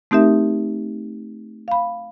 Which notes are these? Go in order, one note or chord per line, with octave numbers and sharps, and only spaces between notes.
A3 C4 D#4 G4 A#4 E5
F5 B5